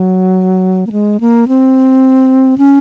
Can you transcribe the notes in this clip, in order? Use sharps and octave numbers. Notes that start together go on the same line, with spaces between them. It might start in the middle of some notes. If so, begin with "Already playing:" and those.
Already playing: F#3
A#3
G#3
A#3
C4
C#4